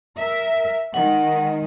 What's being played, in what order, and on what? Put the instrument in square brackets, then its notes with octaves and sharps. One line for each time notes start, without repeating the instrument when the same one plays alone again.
[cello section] A#4 E5
[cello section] D#3 G#3 [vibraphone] F#5